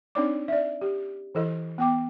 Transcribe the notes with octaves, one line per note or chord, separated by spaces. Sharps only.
C4 D4 D#4 C#5 D5 D6
D5 E5
G4
E3 E4 A4 D#5
B3 G5 D6